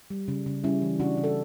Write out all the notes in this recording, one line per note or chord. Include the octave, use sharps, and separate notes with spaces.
G3
C#3
C#3
G3 C#4 E4
E3
C#3 D4 F#4
C#3
A4